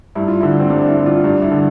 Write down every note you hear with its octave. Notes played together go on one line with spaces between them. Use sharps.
G2 E4
F4
D3 E4
C4
G2 D4
D4
E4
D3
F4
G2 D4
E4
D3